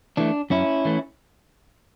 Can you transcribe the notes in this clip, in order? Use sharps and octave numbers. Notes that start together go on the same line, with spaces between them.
E3 A3 D4
F#2 C#4 E4
E3 A3